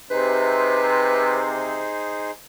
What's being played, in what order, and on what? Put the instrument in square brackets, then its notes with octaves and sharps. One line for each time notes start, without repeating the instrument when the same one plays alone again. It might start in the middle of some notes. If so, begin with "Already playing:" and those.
[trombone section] C3 [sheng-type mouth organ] D#4 G#4 C5 [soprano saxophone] B4